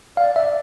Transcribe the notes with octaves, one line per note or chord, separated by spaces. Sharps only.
D5 F5
D5 E5